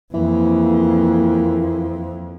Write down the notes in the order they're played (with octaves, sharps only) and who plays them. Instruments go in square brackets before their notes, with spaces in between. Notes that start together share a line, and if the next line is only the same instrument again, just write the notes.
[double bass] F2 [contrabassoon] E3 [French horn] A#3